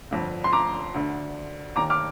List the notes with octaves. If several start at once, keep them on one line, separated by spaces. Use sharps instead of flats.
G1 F2 D3
C6
A#5 D6
D2 D3
D#2 D#3 A#5 D6
D6 F6